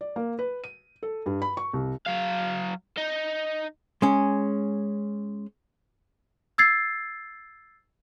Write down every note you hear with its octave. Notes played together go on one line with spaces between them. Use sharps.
D5
A#3
B4
D#7
A4
G2
B5
C#6
C2
F#3 F5
D#4
G#3 C#4
E6 G#6 A6 C7